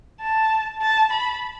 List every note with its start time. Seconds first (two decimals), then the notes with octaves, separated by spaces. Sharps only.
0.21 A5
0.82 A5
1.11 B5